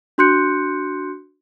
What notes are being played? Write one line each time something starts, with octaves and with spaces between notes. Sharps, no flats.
D4 F#4 C6 F#6 G6 C#7